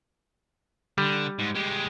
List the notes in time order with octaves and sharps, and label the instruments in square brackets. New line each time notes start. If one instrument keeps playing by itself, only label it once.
[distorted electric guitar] D3 [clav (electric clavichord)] G3
[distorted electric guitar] G#2
G#3 G4